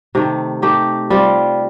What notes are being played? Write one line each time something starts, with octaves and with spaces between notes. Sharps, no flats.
C3 D#3 A3
A3 D#4 G4
G3 C4 F4